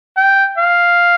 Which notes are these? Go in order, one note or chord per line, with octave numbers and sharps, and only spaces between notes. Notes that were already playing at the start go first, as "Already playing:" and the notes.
G5
F5